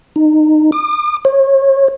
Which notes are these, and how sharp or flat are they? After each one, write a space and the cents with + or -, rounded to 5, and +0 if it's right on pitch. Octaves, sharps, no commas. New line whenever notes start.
D#4 -20
D6 +45
C#5 -30